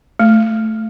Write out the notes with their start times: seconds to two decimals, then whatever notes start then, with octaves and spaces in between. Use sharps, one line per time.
0.20 A3